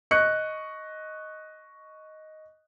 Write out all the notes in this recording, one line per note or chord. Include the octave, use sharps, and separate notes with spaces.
D#5 C#6 F#6 C#7